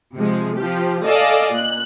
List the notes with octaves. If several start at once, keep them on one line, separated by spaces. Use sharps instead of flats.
C3 F3 G#3
F3 G4
A4 D5 D#5 F5 G#5 E6
A#2 F#6